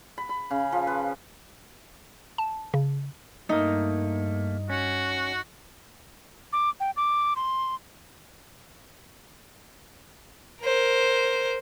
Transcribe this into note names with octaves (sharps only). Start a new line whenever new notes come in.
B5
B5
C#3
F3
B4
A5
C#3
G2 A3 A#3 D#4
C#4 F#4
D6
G5
D6
C6
A#4 C5